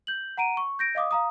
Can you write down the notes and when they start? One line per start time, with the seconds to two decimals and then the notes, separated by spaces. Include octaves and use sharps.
0.07 G6 F#7
0.37 F#5 A#5 D7 D#7
0.57 C#6
0.79 G6 A#6 D7
0.95 D#5 F5 D6 D#6
1.11 F5 A#5 D#6